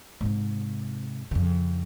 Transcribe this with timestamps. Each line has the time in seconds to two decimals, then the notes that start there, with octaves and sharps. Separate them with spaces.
0.21 G#2 C3
1.31 F2 C#3